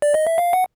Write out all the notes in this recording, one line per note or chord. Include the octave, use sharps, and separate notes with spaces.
D5
D#5
E5
F5
F#5